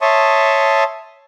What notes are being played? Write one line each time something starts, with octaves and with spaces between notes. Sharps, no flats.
C#5 E5 A5 C6 C#6 D#6